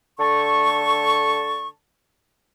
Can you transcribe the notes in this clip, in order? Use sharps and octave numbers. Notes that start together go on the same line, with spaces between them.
D3 A3 A5 C#6